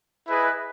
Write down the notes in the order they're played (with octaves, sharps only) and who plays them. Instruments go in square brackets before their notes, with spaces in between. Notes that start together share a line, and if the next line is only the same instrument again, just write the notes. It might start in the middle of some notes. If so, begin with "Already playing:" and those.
[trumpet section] E4 G#4 B4 D#5